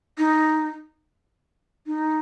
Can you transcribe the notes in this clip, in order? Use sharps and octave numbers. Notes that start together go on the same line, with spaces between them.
D#4
D#4